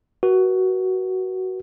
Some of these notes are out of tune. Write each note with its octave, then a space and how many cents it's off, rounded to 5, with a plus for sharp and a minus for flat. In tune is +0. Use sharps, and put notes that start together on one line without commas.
F#4 +15 B4 -45